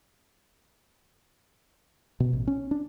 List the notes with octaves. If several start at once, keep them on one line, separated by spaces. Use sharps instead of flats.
B2
A1
C#4
D4